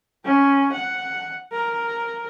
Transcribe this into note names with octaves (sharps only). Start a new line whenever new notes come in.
C#4
F#5
A#4